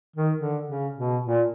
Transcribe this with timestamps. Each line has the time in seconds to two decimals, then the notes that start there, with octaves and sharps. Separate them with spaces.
0.16 D#3
0.38 D3
0.67 C#3
0.96 B2
1.26 A#2